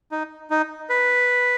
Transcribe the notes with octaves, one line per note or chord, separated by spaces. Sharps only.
D#4
D#4
B4